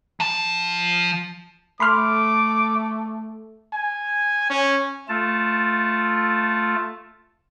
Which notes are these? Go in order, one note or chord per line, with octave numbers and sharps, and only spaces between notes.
F3 A5
A3 B5 C6 D6 F6
G#5
C#4
A3 F4 A5